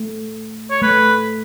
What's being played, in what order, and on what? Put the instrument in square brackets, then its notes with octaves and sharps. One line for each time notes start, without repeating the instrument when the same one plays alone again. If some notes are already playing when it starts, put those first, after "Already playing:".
Already playing: [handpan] A3
[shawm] C#5
[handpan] A3 [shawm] B4